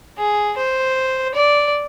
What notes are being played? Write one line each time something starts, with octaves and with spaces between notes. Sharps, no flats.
G#4
C5
D5